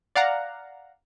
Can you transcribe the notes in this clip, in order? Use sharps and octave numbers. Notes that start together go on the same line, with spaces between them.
D5 F5 F#5 A#5